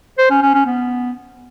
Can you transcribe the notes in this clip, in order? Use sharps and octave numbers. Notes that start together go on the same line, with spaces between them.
C5
C#4
C#4
C#4
B3